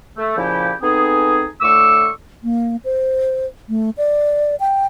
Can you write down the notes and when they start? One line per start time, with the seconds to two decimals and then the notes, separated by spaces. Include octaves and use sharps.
0.17 A3
0.37 A#2 C#3 F3 E4 G4
0.82 A3 B3 C4 D#4 G#4
1.61 A2 D3 A3 C#6 D6 E6
2.43 A#3
2.84 C5
3.69 A3
3.97 D5
4.60 G5